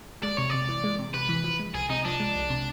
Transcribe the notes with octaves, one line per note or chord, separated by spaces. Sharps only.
G#3 D5
C3 C#5
C3 D5
E3
G#3
C3
C3 B4
E3
F3
G#3
C2 G#4
C3 D#4
F3 D4
G#3
C2
C3